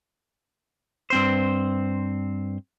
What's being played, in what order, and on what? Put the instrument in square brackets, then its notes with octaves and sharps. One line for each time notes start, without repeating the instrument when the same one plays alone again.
[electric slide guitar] G2 C4 C5